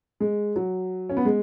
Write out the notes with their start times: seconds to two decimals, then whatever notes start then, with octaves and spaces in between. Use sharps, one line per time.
0.20 G#3
0.56 F#3
1.09 C#4
1.17 B3
1.25 G#3